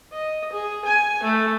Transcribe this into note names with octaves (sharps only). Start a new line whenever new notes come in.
D#5
G#4
G#5
A3